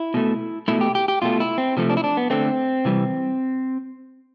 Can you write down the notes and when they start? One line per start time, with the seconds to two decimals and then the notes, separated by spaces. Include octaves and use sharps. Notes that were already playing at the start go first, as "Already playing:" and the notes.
Already playing: E4
0.14 B2 A3
0.68 B2 A3 E4
0.81 G4
0.95 G4
1.08 G4
1.22 B2 A3 F4
1.40 E4
1.58 C4
1.77 C3 F3 A3
1.90 D4
1.97 E4
2.04 D4
2.17 B3
2.30 D3 A3 C4
2.85 C3 E3 G3